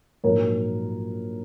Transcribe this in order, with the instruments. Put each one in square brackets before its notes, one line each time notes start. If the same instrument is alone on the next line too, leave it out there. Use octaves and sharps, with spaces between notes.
[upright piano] A#1 G#2 F#3 A#3 A#4 C#5